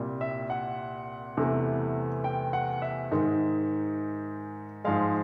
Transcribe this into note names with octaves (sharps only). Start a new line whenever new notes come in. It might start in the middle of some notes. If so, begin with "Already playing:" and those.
Already playing: C2 A#2 G3
E5
F#5
E2 C3 E3 A3
G5
F#5
E5
G#2 D#3 G#3
G#2 F3 G#3 F5